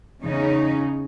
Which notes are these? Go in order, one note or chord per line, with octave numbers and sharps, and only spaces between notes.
E2 C#3 C#4 D#4